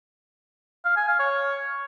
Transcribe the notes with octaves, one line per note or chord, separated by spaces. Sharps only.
F5
G#5
F5
C#5